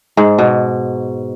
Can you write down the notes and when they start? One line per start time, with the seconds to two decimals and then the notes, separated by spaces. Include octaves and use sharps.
0.17 G#2
0.39 B2